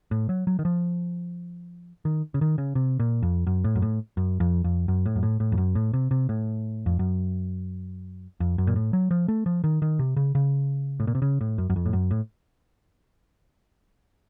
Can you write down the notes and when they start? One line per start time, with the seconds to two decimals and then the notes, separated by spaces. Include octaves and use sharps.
0.11 A2
0.29 F#3
0.47 F#3
0.59 D#3
0.65 F3
2.05 D#3
2.34 C#3
2.41 D#3
2.58 C#3
2.75 C3
3.00 A#2
3.22 F2
3.47 F#2
3.64 A2
3.75 F#2
3.82 A2
4.17 F#2
4.40 F2
4.64 F2
4.88 F#2
5.06 A2
5.16 F#2
5.23 A2
5.40 A2
5.52 F2
5.58 F#2
5.75 A2
5.93 C3
6.11 C3
6.29 A2
6.86 F2
6.99 F#2
8.40 F2
8.58 F#2
8.67 A#2
8.76 A2
8.93 F#3
9.11 F3
9.28 A3
9.46 F3
9.64 D#3
9.82 D#3
9.99 C3
10.16 C#3
10.35 C#3
11.00 A2
11.07 A#2
11.15 C3
11.22 C#3
11.41 A2
11.58 F#2
11.70 F#2
11.76 F2
11.86 A2
11.93 F#2
12.11 A2